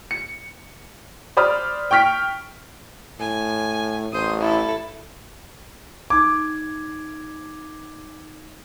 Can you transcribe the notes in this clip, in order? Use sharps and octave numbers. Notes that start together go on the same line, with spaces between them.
C#7
C5 D5 B5 D#6 F6
G5 C#6 F6 B6 D7
A2 G#5
A1 C5 D#6
E4 A4
D#4 D6 G#6